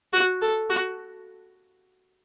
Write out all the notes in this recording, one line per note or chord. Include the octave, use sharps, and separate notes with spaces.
F#4
A4
F#4